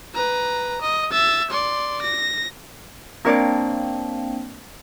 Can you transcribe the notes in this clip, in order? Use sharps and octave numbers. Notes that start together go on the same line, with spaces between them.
B4 A#5
D#5
E5 A6
D5 C6
A#6
A#3 C4 D4 A#4 C#5 D5